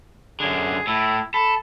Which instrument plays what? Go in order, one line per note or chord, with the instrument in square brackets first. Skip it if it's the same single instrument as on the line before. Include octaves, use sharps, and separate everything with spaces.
[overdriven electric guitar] F#2 D3 [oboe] G#4
[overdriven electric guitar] A2 [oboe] E4
[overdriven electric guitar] A4 [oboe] B5